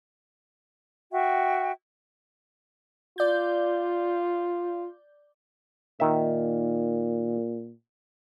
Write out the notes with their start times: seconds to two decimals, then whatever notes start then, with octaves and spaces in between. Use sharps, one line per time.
1.12 F#4 E5 G5
3.18 F4 D5 G6
6.00 A#2 D#3 E5